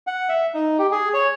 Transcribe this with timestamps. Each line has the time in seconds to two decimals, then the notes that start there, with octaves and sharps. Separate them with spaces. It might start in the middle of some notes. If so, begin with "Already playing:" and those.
0.07 F#5
0.29 E5
0.54 D#4
0.79 G4
0.92 G#4
1.14 C#5